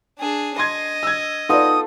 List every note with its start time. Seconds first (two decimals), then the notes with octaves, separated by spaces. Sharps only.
0.19 D4 G#4
0.58 D#5 C6 G#6
1.03 E6 G#6
1.49 B3 D#4 F4 A4 D5 D#6